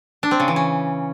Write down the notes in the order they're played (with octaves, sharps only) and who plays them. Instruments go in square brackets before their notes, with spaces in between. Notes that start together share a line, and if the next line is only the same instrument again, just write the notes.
[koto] D4
C4
C#3
E3
C#4